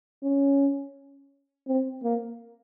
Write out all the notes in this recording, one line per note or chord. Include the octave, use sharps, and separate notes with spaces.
C#4
C4
A#3